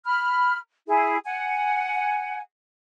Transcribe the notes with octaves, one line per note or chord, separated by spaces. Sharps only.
B5 F6
E4 G#4
F#5 G#5